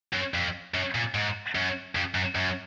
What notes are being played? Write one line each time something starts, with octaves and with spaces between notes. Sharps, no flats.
F#2
F2
F#2
A#2
G#2
F#2
F2
F#2
F#2